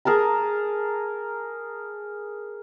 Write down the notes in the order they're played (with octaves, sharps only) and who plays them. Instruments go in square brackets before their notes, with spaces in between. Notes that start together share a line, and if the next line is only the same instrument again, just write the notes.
[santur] G#4 A#4 A5 A#5